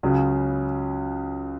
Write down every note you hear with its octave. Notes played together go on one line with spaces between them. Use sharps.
C#2 C#3 F#3 C#4